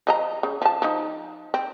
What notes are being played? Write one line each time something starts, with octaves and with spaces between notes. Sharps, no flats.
F3 D#5 A#5
C#3
F3 A5
F3 D#4
C4